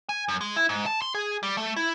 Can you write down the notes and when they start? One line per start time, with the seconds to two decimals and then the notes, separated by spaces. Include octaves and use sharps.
0.09 G#5
0.28 F#2
0.41 G#3
0.56 E4
0.69 G#2
0.86 A5
1.02 C6
1.14 G#4
1.43 G3
1.57 A3
1.76 E4